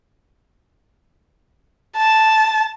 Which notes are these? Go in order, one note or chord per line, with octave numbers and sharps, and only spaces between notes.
A5